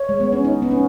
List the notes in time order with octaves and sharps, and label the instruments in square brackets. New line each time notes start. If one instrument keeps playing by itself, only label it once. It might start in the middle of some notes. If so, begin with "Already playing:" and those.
Already playing: [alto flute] C#5
[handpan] G#3
B3
C#4
D#4
B3
C#4